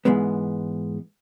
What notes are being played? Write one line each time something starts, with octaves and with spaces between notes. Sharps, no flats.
G#2 E3 G#3 B3